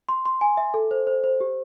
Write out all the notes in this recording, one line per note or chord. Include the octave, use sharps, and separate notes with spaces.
C6
C6
G#5
E5
A4
C5
C5
C5
G4